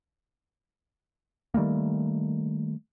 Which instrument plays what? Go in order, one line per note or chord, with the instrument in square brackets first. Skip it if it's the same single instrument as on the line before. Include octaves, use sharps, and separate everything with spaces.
[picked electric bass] D#3 G3 A3 A#3